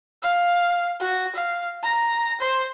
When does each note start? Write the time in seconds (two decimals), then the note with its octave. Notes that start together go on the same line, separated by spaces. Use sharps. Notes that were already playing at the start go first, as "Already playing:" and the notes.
0.22 F5
1.01 F#4
1.35 F5
1.83 A#5
2.41 C5